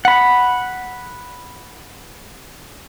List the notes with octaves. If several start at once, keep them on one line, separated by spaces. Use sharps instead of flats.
F#5 B5